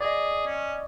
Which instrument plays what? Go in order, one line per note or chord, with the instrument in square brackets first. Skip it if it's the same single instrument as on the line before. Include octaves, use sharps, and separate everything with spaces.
[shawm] G#4 [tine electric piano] D5 D#5
[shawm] C#4